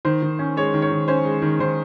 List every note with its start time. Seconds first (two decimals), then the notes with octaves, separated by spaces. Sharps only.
0.05 D#3 C5
0.22 D#3
0.39 C#4
0.57 G#3 C#5
0.74 D#3
0.82 C#5
0.91 D#3
1.08 C#4 C5
1.25 G#3
1.42 D#3
1.59 D#3 C5